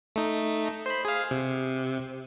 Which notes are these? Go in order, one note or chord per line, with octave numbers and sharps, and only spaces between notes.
A3 D#4
C5 B5
G#4 F5
C3